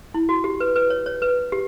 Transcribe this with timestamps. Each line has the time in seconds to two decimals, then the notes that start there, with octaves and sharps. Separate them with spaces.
0.14 E4
0.29 F#4
0.44 G4
0.60 B4
0.76 B4
0.90 C#5
1.06 C#5
1.22 B4
1.52 G4